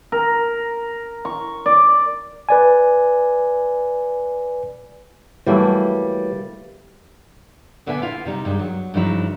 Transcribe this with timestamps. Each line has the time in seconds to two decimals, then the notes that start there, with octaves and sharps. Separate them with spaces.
0.12 A#4
1.25 C#6
1.66 D5
2.49 B4 D5 G#5
5.46 E3 F#3 G3 A3 A#3
7.86 A#2 D3 B3 A4 E5 G#5
8.02 E4 F4 E5 F5
8.26 C3 G3 D#4
8.45 G2 D#3 G#3
8.59 F#3
8.94 G2 C#3 F3 F#3 D#4 E4